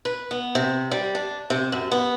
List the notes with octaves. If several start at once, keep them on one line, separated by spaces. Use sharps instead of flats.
B4
B3
C3
G3
D4
C3
F#2
B3